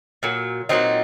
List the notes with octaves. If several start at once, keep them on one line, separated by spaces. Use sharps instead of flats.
A#2 F#3
A#2 F#3 C4 D#4